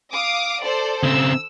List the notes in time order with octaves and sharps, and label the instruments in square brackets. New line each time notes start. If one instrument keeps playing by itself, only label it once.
[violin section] F5 D6 D#6
A4 C5 D5
[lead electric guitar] C#3 C4 [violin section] E6